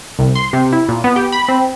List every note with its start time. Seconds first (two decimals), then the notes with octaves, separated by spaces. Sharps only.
0.19 C2
0.35 C6
0.53 C3
0.73 E4
0.89 A#2
1.04 B3
1.16 G4
1.32 B5
1.48 C4